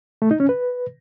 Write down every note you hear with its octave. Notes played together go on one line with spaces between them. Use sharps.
A3
D#4
C#4
B4